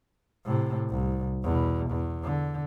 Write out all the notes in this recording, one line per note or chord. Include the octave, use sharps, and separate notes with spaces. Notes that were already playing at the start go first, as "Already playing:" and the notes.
A2 C3
C2
E2 B2
E2
D3